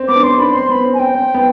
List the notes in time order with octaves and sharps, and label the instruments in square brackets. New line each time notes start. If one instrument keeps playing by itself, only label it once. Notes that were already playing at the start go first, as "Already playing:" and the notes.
Already playing: [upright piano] C4
[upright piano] B3 [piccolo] D6
[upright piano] D4
[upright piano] C4 [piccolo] C6
[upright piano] D4 [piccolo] B5
[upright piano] C4 [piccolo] C6
[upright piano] B3 [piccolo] B5
[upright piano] C4
[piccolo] G#5
[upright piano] C4 [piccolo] G5
[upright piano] C4
B3